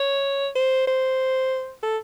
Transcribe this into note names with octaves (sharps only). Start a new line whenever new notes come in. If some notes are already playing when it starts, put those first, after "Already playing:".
Already playing: C#5
C5
C5
A4